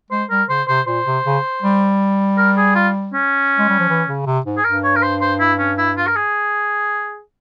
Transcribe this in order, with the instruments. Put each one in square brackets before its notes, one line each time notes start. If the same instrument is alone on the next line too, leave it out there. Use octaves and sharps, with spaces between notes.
[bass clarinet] G#3 [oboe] C5
[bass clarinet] G3 [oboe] A#4
[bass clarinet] C#3 [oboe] C5
[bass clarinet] C3 [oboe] C5
[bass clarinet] A#2 [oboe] C5
[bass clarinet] C3
C#3
G3
[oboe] A#4
G#4
F4
C#4
[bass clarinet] G#3
G3
F3
E3
C#3
C3
G#2
[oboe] G#4
[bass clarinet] G2 [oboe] A#4
[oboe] C#5
A#4
C5
C5
E4
C#4
E4
F4
A#4
G#4